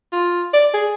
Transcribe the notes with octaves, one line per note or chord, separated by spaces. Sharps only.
F4
D5
G#4